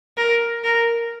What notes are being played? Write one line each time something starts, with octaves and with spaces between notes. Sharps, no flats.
A#4
A#4